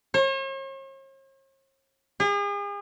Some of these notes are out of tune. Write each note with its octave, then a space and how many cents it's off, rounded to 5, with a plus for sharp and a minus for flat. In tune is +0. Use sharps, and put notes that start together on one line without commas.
C#5 -45
G#4 -40